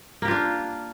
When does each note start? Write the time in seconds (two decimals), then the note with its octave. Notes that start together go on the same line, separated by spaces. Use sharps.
0.22 A#3
0.25 G4
0.28 F4
0.31 D4